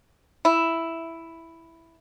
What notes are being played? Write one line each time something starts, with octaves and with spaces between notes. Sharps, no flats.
E4